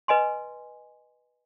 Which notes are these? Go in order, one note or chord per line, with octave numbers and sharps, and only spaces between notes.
B4 D#5 G#5 C6